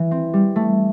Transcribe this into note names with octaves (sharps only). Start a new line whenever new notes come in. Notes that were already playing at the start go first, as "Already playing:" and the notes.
Already playing: E3
C4
G3
A3